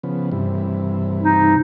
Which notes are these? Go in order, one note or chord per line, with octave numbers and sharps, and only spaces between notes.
C#3 F3 B3
G2 C3 E3
D#4